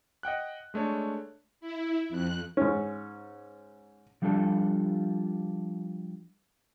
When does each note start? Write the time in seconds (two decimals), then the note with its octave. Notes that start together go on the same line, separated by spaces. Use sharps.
0.23 D#5 F#5 G5 F#6
0.74 G#3 A3 D4 C#5
1.61 E4
2.09 F2 F#6
2.57 G#2 C#4
4.22 F3 G3 D4 F4 A4